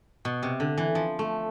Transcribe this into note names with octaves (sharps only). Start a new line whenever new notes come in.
B2
C3
D3
E3
F3
A3